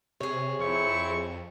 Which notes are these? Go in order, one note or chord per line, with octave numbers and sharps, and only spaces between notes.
C3 G#4 C#5
F2 C4 E4 C#6